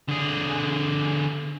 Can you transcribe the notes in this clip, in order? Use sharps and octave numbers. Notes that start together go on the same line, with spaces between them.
D3 G#4